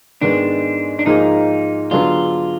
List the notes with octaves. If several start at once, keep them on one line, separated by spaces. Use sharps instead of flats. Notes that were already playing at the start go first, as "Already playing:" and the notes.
G#2 D#3 G#3 B3 D4
D4
G#2 F3 A#3 D#4 F4 G#4
D3 F#3 B3 D4 F4 G#4